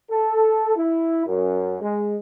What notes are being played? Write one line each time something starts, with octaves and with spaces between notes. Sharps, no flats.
A4
E4
F#2
G#3